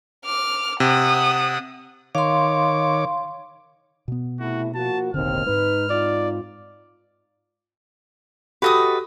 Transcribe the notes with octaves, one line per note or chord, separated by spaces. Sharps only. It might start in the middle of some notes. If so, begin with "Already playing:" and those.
D6 F6
C3 F#5 D#6
D#3 C#5 F5 C6 D6
B2 B3
C3 A3 E4 F#4
F3 A#3 F#4 A5
E1 A1 D#2 D3 C4 F6
G#2 G#3 D#4 B4
C4 D#4 F4 D5
F#4 G4 A4 B4 D#5 D#6